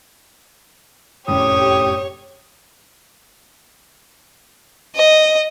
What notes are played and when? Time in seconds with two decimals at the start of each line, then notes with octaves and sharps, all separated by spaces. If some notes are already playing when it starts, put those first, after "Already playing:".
1.28 F1 F#2 A2 G4 C#5 D#6
4.96 D#5